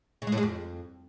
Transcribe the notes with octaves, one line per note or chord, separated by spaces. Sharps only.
C#3
G#3
A2
G#3
F2